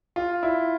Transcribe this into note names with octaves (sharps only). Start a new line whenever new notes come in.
F4
E4